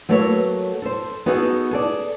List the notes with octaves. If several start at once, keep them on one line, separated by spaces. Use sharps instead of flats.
F#3 A3 A#3 A4 B4 C#5
A4 C5
B3 D#4 F#4 G#4 A4
G#4 A4 D5